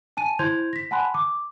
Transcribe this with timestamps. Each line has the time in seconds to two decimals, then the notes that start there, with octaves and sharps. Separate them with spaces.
0.17 G#5 A5 D#7
0.39 E4 C5 C6 G6 G#6 F7
0.73 A#6 B6
0.91 F#5 G#5 A5 B5 C6 F#6
1.14 D6